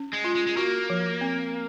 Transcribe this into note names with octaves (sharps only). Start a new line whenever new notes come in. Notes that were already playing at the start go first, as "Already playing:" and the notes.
Already playing: C#4
G#3
F4
G#3
G#3
A#3 F#4
F3
C4